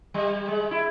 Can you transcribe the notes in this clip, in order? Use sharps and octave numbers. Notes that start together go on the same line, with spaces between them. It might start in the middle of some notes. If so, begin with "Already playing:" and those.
G3
G#3
E4